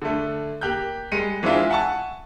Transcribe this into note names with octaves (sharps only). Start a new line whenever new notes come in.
D3 A3
A#3 G4 F#6 G6
G3 G#3 C#7 D#7
E3 G#3 C4 D4 E4 F4
E5 F#5 G#5 A5 C#6